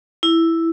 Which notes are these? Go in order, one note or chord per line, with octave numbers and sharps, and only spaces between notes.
E4